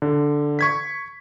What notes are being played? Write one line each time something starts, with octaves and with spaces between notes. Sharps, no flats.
D3
C#6 G#6 B6